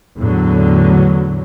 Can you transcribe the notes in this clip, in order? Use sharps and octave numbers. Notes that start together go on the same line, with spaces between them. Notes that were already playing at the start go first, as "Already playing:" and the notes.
E2 A2 D3 F#3